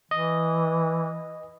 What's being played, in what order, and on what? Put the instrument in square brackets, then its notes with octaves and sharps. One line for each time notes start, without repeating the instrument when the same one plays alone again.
[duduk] E3 [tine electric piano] D#5